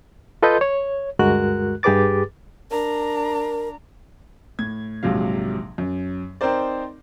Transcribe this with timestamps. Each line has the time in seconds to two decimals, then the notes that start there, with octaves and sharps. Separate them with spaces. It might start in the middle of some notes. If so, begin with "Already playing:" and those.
0.43 F4 A4 B4 D#5 C6 G6
0.61 C#5
1.19 D2 G2 G#3 F#4 A#4 F#6
1.83 G2 G4 G#4 B4 D6 A6
2.71 D4 A#4 A#5
4.59 A2 G#6
5.03 A#1 G#2 C3 F#3 F5
5.78 F#2
6.41 C4 D#4 A#4 C5 D5